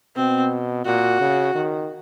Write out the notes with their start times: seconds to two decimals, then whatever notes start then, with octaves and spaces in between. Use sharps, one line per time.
0.16 B2 C4
0.86 A#2 F#4
1.20 C#3
1.55 D#3